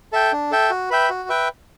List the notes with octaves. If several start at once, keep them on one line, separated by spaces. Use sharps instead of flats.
A4 E5 G5
D4
A4 E5 G5
F#4
B4 E5 G5
F#4
B4 E5 G5